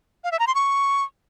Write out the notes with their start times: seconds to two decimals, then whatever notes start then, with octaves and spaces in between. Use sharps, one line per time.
0.24 F5
0.32 E5
0.39 A#5
0.47 C6
0.55 C#6